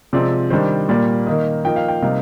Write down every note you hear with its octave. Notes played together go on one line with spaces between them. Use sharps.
C3 F3 G#3 C4 D5
D#3 G3 D4 C5
A#2 G3 A#3 D5
D#3 A#3 D#4 D#5
F3 A#3 D#4 G5
F5
G5
C3 G3 A#3 D#4 F5